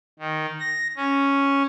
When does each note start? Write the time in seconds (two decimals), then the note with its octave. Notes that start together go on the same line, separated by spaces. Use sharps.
0.19 D#3
0.60 A#6
0.97 C#4